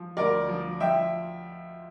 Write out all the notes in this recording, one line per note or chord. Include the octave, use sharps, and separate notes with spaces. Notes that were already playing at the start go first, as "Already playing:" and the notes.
Already playing: F3
D2 A#4 D5
F3
F3 E5 G5